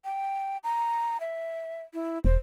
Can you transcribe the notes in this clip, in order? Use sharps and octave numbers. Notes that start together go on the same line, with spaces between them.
G5
A#5
E5
E4
E1 C5